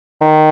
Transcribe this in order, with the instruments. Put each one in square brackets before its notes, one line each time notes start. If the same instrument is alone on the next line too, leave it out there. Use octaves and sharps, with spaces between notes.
[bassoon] D#3